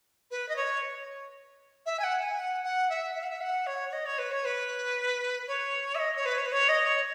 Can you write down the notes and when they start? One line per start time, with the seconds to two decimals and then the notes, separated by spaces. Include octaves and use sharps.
0.31 B4
0.49 D#5
0.56 C#5
1.86 E5
1.99 G#5
2.03 F#5
2.20 G#5
2.38 F#5
2.64 F#5
2.89 E5
3.15 E5
3.23 F#5
3.30 E5
3.41 F#5
3.66 C#5
3.89 C#5
3.93 D#5
4.06 C#5
4.18 B4
4.31 C#5
4.45 B4
5.48 C#5
5.95 E5
5.99 D#5
6.16 C#5
6.25 B4
6.38 C#5
6.46 B4
6.52 C#5
6.69 D#5
6.85 C#5